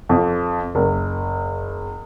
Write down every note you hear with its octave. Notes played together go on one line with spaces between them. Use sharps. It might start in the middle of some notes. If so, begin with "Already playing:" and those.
F2
F#1